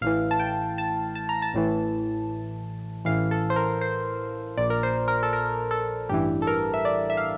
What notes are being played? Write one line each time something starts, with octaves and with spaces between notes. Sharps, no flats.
A1 A2 E3 F5
A5
G5
A5
A5
A#5
A5
A1 A2 E3
A1 A2 E3 F5
A4
C5
A#4
C5
A#1 A#2 D5
A#4
C5
A#4
A4
A#4
A4
A1 G2 E3 G4
A4
A#4
E5
D5
E5
F5